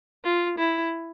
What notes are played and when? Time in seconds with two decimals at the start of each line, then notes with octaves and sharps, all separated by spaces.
0.24 F4
0.58 E4